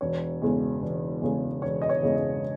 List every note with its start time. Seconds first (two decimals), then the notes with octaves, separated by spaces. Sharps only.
0.01 E1 C#5
0.42 E2 C#3 G#3
0.82 E1
1.22 E2 C#3 G#3
1.62 E1 C#5
1.82 D#5
1.89 C#5
2.03 E2 C#3 G#3
2.16 D#5